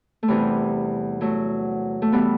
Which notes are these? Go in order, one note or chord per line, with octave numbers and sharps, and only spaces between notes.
A3
E2 C3 E3 G3
F#3 A3
A3
E3 G3 B3